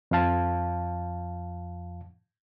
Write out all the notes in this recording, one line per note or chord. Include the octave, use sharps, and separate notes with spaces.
F2 F3 F5 A5